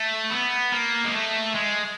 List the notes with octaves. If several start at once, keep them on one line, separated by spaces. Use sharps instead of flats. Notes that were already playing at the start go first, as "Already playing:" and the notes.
Already playing: A3
B3
A#3
G#3
A3
G#3